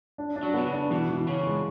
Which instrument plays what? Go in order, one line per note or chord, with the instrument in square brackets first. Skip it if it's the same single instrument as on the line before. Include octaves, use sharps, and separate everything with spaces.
[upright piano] D4
D4
[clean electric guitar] F#3
[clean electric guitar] B2 [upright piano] B3
[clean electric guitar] C#3
[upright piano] D4
[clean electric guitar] B2 [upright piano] E3
[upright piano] E3
[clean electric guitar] C#3 [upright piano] C#4
[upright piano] G#3